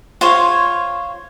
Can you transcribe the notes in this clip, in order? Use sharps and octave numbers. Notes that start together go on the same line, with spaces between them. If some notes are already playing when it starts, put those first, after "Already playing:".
F4 C5 C#5